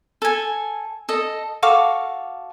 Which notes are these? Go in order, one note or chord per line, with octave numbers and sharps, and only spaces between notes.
A4 G#5
A4 D#5
F#4 A4 F5 D6